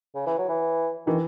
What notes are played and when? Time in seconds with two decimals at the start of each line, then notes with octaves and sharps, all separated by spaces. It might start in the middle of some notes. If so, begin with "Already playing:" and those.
0.15 C#3
0.26 E3
0.38 F#3
0.49 E3
1.06 D#3 E3